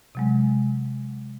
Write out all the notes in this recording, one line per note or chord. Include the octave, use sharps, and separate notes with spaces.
C3 F#3 G#3